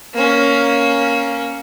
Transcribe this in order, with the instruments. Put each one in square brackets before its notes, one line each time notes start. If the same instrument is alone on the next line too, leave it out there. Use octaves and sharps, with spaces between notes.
[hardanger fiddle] A#3 C#4